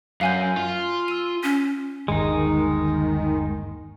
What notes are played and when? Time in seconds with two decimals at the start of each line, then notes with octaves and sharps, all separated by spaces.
0.21 F#2 F5 G#5 G6
0.57 F4
1.08 E6 D#7
1.43 C#4
2.08 G1 D#2 D#3 G#3 D#4